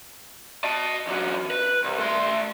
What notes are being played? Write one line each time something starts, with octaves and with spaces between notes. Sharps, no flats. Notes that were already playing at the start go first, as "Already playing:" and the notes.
D#5 A5
E2 F#3
B4
C2
A3 C6